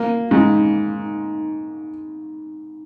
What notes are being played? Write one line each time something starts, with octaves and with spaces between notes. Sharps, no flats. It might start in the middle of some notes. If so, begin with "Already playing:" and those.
Already playing: A#3
G#2